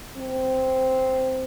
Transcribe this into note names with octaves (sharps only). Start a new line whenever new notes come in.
C4